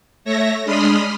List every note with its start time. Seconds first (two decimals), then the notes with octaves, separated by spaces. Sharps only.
0.25 A3 C#5 E5 A#6
0.65 G#3 D4 B5 C6 D#6 F6